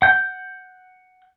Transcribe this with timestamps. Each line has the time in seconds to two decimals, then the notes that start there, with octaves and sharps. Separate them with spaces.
0.02 F#5 G6